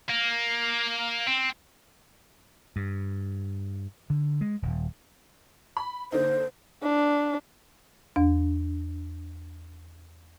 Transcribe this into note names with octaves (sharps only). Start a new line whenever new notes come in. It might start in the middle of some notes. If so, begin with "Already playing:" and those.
A#3
C4
G2
D3
G#3
D#1
B5
D3 A#3 D#4 C5
D4
E2 D4